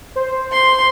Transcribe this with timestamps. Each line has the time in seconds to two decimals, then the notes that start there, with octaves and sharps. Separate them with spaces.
0.16 C5
0.51 C6